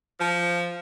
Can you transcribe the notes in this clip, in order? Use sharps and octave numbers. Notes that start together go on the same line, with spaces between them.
F3